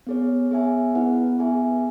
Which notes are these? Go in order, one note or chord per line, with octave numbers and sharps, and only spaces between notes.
B3 G#4 C#5
B3 G#4 E5 G#5
B3 E4 B4 F#5
B3 G#4 E5 G#5